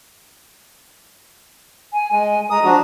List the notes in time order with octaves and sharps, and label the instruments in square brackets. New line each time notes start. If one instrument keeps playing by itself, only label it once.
[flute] G#5
[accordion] G#3 [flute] G#5
[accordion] G#3 D#6 [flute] A#5
[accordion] F3 D4 F#4